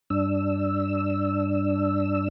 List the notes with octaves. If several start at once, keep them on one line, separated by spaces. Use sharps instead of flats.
G2 D4 E6